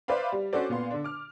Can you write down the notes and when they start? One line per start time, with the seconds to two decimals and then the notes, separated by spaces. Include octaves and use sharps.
0.08 B4 C5 D5 E5 F5 B5
0.32 G3
0.53 C#4 D4 F#4 A4 C5 D5
0.69 A#2 B3 F5 C6
0.91 D3 D4
1.04 D6 F6